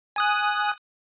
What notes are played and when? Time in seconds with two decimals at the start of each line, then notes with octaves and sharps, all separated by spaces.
0.16 G#5 D#6 F#6